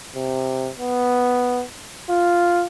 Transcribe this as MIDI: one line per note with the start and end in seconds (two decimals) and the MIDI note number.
0.16 0.70 48
0.79 1.63 59
2.10 2.64 65